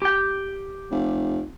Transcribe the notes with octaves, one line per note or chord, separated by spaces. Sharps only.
G4 G5
F1